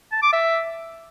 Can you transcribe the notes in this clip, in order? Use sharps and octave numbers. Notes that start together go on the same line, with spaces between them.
A5
D6
E5